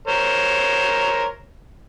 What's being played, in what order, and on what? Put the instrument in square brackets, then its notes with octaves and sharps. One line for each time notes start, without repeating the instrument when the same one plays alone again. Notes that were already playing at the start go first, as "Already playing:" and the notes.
[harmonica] A#4 C5 C#5